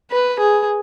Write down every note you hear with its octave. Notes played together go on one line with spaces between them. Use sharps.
B4
G#4